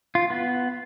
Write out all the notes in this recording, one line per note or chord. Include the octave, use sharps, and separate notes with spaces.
F4
B3